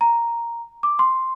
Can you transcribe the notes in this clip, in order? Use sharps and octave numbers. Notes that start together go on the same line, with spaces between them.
A#5
D6
C6